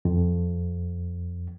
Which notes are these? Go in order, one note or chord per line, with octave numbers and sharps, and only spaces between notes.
F2